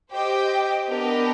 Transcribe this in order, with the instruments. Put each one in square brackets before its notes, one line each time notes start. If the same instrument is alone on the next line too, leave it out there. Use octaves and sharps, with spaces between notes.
[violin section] G4 C5 D#5 G5
B3 D4 G4 A#4 D#5